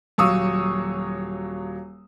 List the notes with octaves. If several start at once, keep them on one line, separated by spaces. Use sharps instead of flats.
D#1 F#3 F5 C#6 D#6 E6